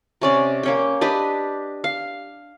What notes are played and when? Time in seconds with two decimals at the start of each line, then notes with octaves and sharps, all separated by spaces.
0.21 C3 C#4 D5
0.63 A#3 C#4 G5
1.01 D4 G4 B4 D#5
1.84 F5